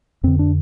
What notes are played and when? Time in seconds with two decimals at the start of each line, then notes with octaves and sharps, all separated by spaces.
0.23 F2 D3 C4
0.39 D4